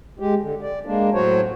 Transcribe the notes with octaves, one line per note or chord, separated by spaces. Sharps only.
G#3 G4
D3
D5
G#3 A#3 D4
A2 F#3 F#4 C5 C#5